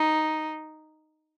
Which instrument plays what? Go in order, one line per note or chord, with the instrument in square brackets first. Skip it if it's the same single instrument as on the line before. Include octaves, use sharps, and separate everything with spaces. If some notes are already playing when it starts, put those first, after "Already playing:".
Already playing: [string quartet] D#4